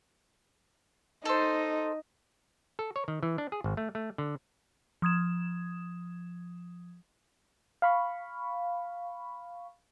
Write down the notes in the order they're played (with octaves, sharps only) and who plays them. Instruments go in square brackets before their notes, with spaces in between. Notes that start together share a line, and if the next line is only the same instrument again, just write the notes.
[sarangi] D#4 [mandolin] A4 C5
[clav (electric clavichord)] A4
C#5
D#3
E3
D4
G#4
G#1
A3
A3
D3
[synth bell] F3 D#6 G#6 E7
[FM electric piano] F5 B5 C#6